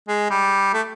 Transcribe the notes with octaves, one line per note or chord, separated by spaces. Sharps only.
G#3
G3
A3